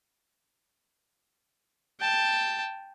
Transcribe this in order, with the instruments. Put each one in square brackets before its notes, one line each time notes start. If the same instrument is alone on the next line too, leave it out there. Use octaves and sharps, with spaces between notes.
[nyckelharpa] G5 A5